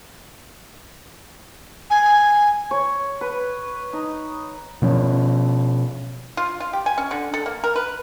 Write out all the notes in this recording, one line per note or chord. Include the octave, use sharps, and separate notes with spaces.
G#5
C#5
B4
D#4
B2 F3 C#4
F4
F4
G4
G#5
C#4
D3
A4
A#3
A#4
B4